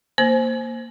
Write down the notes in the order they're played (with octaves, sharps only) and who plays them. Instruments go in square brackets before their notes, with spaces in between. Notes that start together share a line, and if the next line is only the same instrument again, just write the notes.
[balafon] A#3 C5